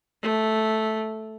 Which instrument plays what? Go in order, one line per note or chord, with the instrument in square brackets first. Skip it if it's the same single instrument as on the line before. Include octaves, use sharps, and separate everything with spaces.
[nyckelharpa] A3